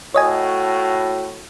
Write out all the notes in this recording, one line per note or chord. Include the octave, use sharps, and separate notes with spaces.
A2 F#4 C#5 D#5 G#5